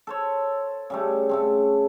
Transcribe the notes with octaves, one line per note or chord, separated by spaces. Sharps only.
A4 C5 C#5
C#3 G3 A3
C#3 A3 C4